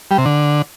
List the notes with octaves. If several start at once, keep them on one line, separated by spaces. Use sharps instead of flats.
G3
C3
D3